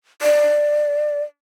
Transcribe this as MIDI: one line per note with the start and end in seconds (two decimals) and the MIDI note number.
0.22 1.23 74